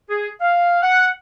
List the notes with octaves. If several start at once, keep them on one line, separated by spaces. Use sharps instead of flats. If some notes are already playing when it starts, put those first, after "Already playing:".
G#4
F5
F#5